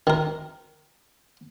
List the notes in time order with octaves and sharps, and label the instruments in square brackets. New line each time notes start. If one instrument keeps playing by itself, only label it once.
[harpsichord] D#3 A#4